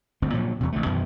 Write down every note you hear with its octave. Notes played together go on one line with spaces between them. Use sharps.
G1 D2 C4
A#2 F3 F#3
E2 C3
A1 D3 A3
F#2 B2 D#3 E3